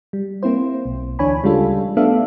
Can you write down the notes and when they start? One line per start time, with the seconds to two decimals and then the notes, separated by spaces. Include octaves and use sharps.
0.13 G3
0.43 A#3 C4 E4 C5
0.85 B1
1.19 D2 E3 D4 C#5 G#5 B5
1.43 C#3 G3 G#3 D4 F4 A4
1.97 A3 B3 D4 A4 E5 F5